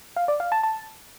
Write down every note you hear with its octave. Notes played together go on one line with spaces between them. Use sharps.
F5
D5
F5
A5
A5